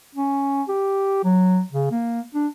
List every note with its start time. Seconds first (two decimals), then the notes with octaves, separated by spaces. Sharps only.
0.15 C#4
0.68 G4
1.24 F#3
1.72 C#3
1.91 A#3
2.34 D4